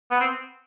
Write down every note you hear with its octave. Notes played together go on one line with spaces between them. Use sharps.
B3
C4